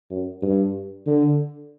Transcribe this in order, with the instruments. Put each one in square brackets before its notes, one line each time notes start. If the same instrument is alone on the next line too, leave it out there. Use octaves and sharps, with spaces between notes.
[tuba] F#2
G2
D3